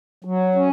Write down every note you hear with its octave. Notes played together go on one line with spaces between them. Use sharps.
F#3
C#4